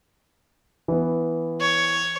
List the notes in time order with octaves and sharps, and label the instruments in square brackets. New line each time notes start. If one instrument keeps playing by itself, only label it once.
[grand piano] E3 B3
[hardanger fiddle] C#5